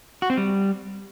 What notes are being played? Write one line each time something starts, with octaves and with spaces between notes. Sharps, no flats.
F#4
C4
G3